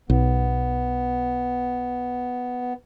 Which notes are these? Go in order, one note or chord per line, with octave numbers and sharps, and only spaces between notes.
B1 B3